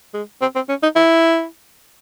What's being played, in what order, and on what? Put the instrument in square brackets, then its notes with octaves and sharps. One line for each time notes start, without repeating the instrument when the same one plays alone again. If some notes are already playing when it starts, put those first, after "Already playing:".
[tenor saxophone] G#3
C4
C4
C#4
D#4
E4